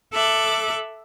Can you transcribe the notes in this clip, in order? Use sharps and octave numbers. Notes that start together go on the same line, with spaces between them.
A4 E5 D6 F#6